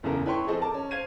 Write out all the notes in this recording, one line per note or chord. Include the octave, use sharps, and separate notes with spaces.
F#1 E2 C#3 B3 A4 A#4
E4 B4 C#5 G5 C6 C#6
F3 C4 G#4 A4 C5 D#5
A#4 A5 D6
C#4
C5 F5 G#6 D#7